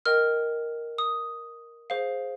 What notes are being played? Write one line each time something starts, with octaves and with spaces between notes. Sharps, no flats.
A#4 D#5 G5 F6
D#6
G#4 C5 F5